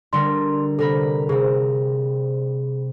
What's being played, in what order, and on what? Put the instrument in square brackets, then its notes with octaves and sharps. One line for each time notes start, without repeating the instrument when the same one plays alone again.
[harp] D3 G3 A#4 [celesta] C6
[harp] C3 A#4 B5 [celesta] A4
[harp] C3 C4 [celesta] G#4